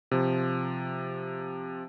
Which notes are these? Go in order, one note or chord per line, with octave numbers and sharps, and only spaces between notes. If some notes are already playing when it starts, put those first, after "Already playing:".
C3 F3